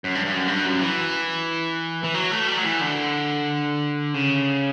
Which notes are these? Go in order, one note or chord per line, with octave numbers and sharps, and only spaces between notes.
F#2
G2
G2
F#2
G2
F#2
E3
E3
F#3
A3
G3
F#3
E3
D3
C#3